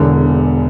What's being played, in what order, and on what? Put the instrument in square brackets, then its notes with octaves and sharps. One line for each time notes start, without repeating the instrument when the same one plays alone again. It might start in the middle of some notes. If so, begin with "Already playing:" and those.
Already playing: [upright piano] E1 E2 D3